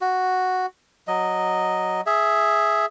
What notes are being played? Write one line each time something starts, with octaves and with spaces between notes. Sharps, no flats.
F#4
F#3 D#5
G#4 E5